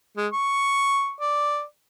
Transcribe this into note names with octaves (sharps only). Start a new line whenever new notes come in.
G#3
C#6
D5